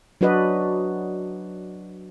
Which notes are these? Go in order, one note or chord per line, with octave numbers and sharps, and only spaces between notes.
F#3 D4 F#4 B4 D5 D#5